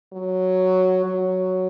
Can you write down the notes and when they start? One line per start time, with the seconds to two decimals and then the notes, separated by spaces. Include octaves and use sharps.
0.13 F#3
1.05 F#3